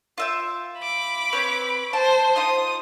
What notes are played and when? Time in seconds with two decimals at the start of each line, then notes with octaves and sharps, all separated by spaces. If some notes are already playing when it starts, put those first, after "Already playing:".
0.18 F4 E5 G5
0.79 B5 D6
1.33 C4 B4 C#5
1.93 C5 A5
2.36 D#4 F4 C6 D#6